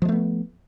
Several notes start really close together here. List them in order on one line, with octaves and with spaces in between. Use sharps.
F3 G#3 A3 B3